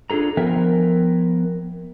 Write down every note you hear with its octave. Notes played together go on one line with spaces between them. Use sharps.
D4 F4 G#4 A4 A#5
F3 B3 A#4 E5 G5 G#5